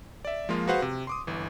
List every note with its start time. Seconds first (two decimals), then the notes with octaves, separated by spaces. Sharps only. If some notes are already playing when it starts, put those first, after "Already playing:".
0.25 D5 E5
0.49 F3 G#3 A#3 F4
0.68 F#4 G#4 B4 C5 F5 F#5
0.82 C3
1.07 C6 D6 D#6
1.27 G1 E3